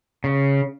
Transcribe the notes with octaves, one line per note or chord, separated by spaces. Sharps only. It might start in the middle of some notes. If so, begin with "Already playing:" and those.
C#3